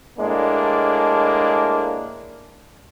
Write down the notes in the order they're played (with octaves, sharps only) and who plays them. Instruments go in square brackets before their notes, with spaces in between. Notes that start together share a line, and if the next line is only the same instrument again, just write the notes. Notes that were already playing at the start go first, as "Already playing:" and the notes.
[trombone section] A2 G#3 A#3 D4